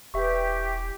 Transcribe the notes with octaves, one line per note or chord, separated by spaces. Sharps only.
E1 E3 G4 B4 D5 E5 C#6